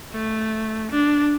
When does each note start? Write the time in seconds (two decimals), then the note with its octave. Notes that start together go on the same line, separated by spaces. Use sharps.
0.12 A3
0.91 D4